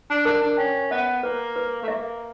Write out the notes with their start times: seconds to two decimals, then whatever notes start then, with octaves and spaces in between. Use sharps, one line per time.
0.10 D4
0.25 D4 A#4
0.42 D4
0.58 C#4 G5
0.91 B3 E5
1.23 A#3 B4
1.56 B4
1.82 A3
1.88 A#3 E5